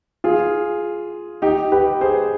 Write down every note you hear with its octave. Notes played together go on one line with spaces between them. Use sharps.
F4 G#4
D#4 G4
G4 B4
G#4 C5